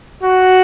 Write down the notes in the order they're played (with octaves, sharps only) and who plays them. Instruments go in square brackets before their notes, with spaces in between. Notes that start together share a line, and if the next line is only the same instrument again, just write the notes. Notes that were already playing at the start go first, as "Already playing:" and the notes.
[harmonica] F#4